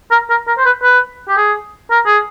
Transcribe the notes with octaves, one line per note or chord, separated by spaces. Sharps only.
A#4
A#4
A#4
C5
B4
B4
G4
G#4
A#4
G#4